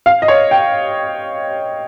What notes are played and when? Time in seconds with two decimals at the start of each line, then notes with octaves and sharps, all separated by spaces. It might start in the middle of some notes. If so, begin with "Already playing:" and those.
0.06 F5
0.22 D#5
0.28 C#5
0.51 G5